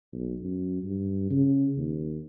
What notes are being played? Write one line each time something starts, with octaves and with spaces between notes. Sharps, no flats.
B1
F#2
G2
C#3
D#2